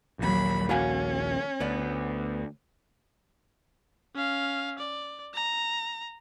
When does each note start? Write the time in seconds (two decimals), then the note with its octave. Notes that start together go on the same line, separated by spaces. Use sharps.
0.19 A#1 D#2 F#3 B5
0.69 C#4 F#4 F5 G#5
1.60 D2 B3 D5
4.15 C#4 F5
4.79 D5
5.34 A#5